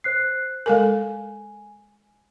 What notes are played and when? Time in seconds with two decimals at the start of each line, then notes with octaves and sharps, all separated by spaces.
0.04 C5 F#6 C7
0.66 G#3 A4 A#4 G#5